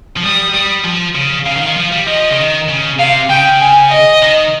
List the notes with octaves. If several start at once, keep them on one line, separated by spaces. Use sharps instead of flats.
F3
G3 D#6
G3
F3
C#3
C#3 F5
D#3
D#3
F3
G3
F3 D#5
C#3
D#3
C#3
C3 F5
C#3 G5
G#5
D#5
D#3